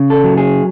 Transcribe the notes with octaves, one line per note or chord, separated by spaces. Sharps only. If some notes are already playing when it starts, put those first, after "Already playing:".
Already playing: C#3
A4
F#3
G#4